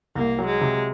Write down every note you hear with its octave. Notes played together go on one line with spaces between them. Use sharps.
C2 A#3
F#3
G#3
C3